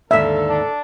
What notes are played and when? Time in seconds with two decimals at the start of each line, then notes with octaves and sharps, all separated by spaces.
0.11 D#2 G#2 D3 A4 E5
0.49 D4